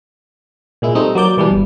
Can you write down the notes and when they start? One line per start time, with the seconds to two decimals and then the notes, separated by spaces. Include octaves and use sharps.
0.82 A#2 G#3 E4
0.95 G3 A3 C4 D#4
1.15 F#3 A#3 D5 G6
1.37 B2 E3 G3 D4
1.51 G1